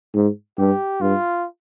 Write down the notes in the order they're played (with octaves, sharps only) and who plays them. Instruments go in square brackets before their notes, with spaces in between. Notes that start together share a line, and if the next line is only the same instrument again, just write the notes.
[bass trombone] G#2
[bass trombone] G2 [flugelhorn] G4
[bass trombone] G2 [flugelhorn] F4